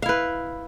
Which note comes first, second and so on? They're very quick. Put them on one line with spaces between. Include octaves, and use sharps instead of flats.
F5 E4 B4